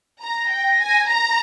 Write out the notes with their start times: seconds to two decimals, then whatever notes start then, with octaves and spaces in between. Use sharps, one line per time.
0.22 A#5
0.31 A#6
0.51 G5
0.80 G#5
1.09 A#5